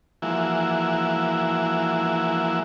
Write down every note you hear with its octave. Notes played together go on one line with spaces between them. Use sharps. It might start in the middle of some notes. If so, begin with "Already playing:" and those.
E3 F3 G#3 A#3 E4 F#4